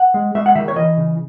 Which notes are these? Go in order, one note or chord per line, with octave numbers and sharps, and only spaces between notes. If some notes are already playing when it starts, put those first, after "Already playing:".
Already playing: F#5
G#3
G#3 E5
F#5
D#3 E5
C#5
E3 D#5
C#3